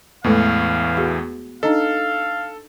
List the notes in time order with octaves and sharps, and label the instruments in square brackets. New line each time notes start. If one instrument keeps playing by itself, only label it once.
[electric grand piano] E2 A2 E3 [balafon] G#3 A3 A4 [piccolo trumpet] F5
[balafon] B3 F#4 G#4
[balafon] D4 D#4 D#5 [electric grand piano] A4 [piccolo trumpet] F5